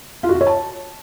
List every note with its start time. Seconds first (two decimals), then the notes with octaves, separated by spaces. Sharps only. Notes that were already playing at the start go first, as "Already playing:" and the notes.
0.23 F4
0.29 F#4
0.35 F4
0.41 C#5
0.47 A5